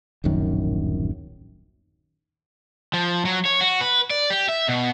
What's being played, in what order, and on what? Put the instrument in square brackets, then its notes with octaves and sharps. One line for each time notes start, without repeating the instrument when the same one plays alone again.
[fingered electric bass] D1 A#1 F#2 D#3
[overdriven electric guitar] F3
F#3
C#5
F#4
B4
D5
G4
E5
B2